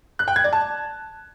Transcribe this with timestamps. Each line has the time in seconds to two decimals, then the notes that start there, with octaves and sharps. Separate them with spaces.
0.19 F#6
0.28 G5
0.36 G#6
0.44 D5
0.53 A5